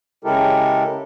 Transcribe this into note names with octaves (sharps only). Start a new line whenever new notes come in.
C#3 G#3 E4 G4 A4 A#4